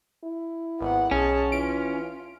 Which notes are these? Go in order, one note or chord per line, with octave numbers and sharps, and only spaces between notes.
E4
G#1 B3 F#5
B1 C#4 G#4 A5
E3 F4 D7